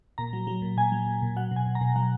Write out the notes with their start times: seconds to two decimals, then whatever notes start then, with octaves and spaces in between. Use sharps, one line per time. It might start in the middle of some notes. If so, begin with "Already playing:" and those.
0.18 A#2 A#5
0.33 F#3
0.47 F#3
0.62 A#2
0.77 A#2 G#5
0.92 F#3
1.06 A#2
1.22 A#2
1.36 F#3 F#5
1.51 B2
1.56 G#5
1.66 B2
1.75 A#5
1.81 B2
1.96 F#3 F#5